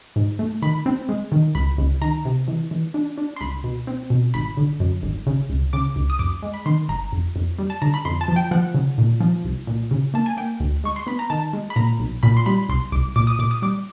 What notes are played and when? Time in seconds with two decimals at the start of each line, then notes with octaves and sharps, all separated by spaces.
0.16 G#2
0.39 A3
0.62 D#3 B5
0.86 C4
1.09 G#3
1.32 D#3
1.55 C#2 B5
1.78 C#2
2.02 D#3 A#5
2.25 C3
2.48 E3
2.71 E3
2.94 D4
3.18 D4
3.36 C6
3.41 C#2 B5
3.64 B2
3.87 C4
4.10 B2
4.34 G#1 B5
4.57 D3
4.80 F#2
5.03 G#1
5.27 C#3
5.50 C#2
5.73 C#3 D6
5.96 C#2
6.10 D#6
6.19 F#2 D6
6.42 G#3
6.54 B5
6.66 D#3 C6
6.89 G1 A#5
7.13 F2
7.36 F2
7.59 G3
7.70 A5
7.82 D3 A#5
7.94 B5
8.05 F2 C6
8.21 A5
8.28 F3
8.36 G5
8.51 F3 F#5
8.74 C#3
8.98 A#2
9.21 F3
9.44 C2
9.67 A#2
9.91 C#3
10.14 A#3 A5
10.26 G#5
10.37 A#3 G5
10.60 D2
10.84 G#3 C#6
10.96 C6
11.07 B3 B5
11.19 A#5
11.30 D#3 A5
11.53 G#3
11.70 B5
11.76 A#2 A#5
11.99 B1
12.23 A#2 B5
12.37 C6
12.46 G3 B5
12.69 C2 C6
12.92 C2 D6
13.16 A#2 D6
13.27 D#6
13.39 A#2 D6
13.51 D#6
13.62 G3 D6